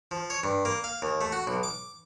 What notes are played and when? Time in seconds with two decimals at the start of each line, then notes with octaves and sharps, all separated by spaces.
0.11 F3
0.30 C#5
0.44 G2
0.65 A#3
0.84 F5
1.02 D#2
1.21 A3
1.32 F#4
1.47 B1
1.63 D6